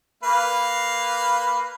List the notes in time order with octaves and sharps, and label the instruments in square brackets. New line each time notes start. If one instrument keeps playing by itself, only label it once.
[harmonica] A#3 B4 F5